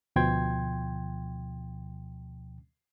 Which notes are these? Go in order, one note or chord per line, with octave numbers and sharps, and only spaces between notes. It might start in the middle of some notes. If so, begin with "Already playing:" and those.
D2 B2 F3 G5 C6 G#6